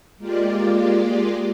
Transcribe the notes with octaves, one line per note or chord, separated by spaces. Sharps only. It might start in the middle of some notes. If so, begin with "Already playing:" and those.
G#3 A#3 F4 G4 D5